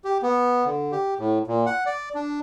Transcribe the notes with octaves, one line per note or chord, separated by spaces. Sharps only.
G4
B3
D3
G4
A2
A#2
F#5
D5
D4